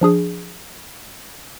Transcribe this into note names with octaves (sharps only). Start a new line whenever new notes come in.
F3 D4 G#4 D#6